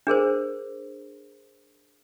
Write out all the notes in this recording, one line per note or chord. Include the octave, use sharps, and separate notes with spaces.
D4 G#4 A#4 C5